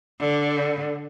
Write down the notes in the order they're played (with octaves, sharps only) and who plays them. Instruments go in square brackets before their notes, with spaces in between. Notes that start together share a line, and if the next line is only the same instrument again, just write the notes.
[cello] D3